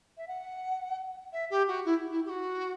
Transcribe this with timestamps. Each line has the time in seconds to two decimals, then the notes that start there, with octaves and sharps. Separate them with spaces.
0.17 E5
0.27 F#5
1.32 E5
1.50 G4
1.68 F#4
1.85 E4
2.11 E4
2.25 G4
2.29 F#4